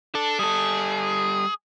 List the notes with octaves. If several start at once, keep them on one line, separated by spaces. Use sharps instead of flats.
D4 A4
G3 G#4 A4